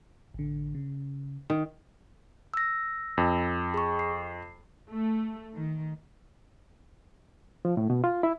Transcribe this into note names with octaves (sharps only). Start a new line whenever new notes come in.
A1 D3
C#3
D#3
E6 A#6
F2
G#4 C#6
C7
A3
D#3
F3
A2
B2
F4
E4